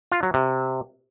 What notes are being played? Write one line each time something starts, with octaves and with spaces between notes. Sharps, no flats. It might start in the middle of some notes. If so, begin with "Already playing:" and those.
F4
F#3
C3